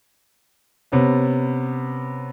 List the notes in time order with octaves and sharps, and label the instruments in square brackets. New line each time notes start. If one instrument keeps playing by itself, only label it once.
[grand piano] C3 B3 C#4